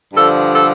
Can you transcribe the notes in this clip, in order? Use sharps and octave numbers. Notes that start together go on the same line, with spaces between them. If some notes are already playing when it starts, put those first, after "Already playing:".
G2 D3 F3 A4
A4